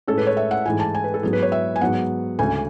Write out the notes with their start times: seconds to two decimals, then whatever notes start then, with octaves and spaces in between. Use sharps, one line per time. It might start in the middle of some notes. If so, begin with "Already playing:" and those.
0.07 A2 G#3 C#4 A4
0.17 B4
0.27 C#5
0.37 E5
0.51 F#5
0.66 G#2 E3 A3 G#5
0.80 A5
0.95 G#5
1.04 B4
1.14 A4
1.23 G#2 F#3 B3 G#4
1.33 B4
1.43 C#5
1.52 E5
1.76 G#5
1.81 G#2 F#3 B3 F#5
2.39 D2 C#3 G#3 G#5